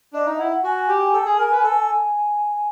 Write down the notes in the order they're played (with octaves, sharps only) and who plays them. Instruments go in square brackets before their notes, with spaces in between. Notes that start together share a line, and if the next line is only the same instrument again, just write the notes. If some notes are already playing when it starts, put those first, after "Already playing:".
[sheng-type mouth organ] D4 [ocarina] D#5
[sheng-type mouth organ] D#4 [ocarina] E5
[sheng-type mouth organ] E4 [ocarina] F#5
[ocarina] F#5
[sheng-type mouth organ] F#4 [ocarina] G#5
[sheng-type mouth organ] G4
A4
G#4
A#4
B4
A4